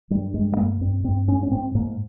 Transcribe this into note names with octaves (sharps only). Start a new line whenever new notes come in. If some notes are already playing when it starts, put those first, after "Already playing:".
G2 G3
G2 G#3
G#3
G2 A#3
G2 C4
G2 C4
G#2 C#4
C#4
G#2 C4
G#2 A#3